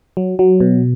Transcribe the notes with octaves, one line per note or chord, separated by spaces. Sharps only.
F#3
F#3
B2